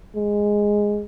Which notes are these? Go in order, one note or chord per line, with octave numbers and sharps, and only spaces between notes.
G#3